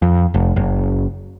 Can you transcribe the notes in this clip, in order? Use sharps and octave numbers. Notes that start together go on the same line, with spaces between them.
F2
F1
F#1